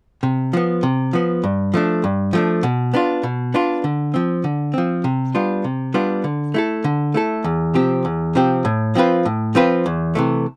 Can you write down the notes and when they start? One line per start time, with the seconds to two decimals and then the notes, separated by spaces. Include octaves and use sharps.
0.23 C3
0.53 F3 B3
0.83 C3
1.13 F3 B3
1.44 G2
1.74 F3 A3 D4
2.04 G2
2.33 F3 A3 D4
2.63 B2
2.94 B3 D4 F4
3.23 B2
3.54 B3 D4 F4
3.84 D3
4.14 F3 C4
4.44 D3
4.74 F3 C4
5.04 C3
5.34 G3 B3 D4 F4
5.64 C3
5.94 G3 B3 D4 F4
6.24 D3
6.54 A3 E4 A4
6.84 D3
7.14 A3 E4 A4
7.44 E2
7.74 C3 F3 C4 G4
8.05 E2
8.35 C3 F3 C4 G4
8.65 A2
8.95 F3 C4 F4 B4
9.25 A2
9.55 F3 C4 F4 B4
9.86 E2
10.15 C3 E3 A3